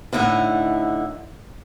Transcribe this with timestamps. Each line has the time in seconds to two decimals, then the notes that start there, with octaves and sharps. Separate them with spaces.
0.13 A2 D3 D#4 E4 F#5